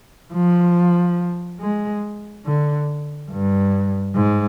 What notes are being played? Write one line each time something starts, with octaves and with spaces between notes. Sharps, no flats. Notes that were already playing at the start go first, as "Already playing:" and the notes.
F3
G#3
D3
G2
G#2